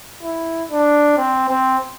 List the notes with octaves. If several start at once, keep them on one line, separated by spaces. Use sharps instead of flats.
E4
D4
C4
C4